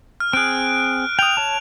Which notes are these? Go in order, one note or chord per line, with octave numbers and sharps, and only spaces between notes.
F6
C4 G#4 F#6 D7
G5 D#6 F7
C#5 A5